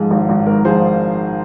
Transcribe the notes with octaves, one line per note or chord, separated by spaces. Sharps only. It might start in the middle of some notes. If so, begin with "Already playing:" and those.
Already playing: G#2 F3 G#4
G#1
G#1
G#2 A#4
F3 G#4 C5